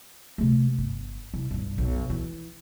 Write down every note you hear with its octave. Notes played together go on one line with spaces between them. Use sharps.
C3 A3
G1
C2
B1 G2
B1 F#2
E3